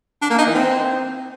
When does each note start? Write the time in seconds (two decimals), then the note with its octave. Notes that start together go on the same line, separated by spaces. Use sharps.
0.22 D4
0.30 A#3
0.38 D#4
0.46 E3
0.54 C4